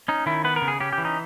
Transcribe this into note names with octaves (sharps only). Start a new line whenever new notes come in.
C#4 D#4
D#3 E4
B3 B4
A#4
C#3
G#4
C#4 G4
G4
E3
D#4